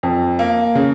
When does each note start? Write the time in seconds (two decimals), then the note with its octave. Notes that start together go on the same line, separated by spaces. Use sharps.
0.03 F2
0.39 A#3
0.75 C#3